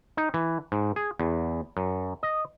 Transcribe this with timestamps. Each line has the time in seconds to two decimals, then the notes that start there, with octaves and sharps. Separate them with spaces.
0.17 D#4
0.34 E3
0.72 G#2
0.96 G#4
1.19 E2
1.77 F#2
2.23 D#5